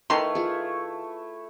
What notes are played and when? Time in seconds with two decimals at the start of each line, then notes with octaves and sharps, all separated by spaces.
0.10 D#3 A3 E4 B4 E5 F5 C6
0.35 F4 G#4